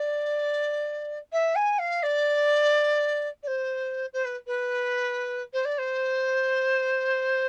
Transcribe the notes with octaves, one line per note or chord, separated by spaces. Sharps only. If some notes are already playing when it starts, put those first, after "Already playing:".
Already playing: D5
E5
G#5
F5
D5
D5
C5
C5
B4
B4
C5
D5
C5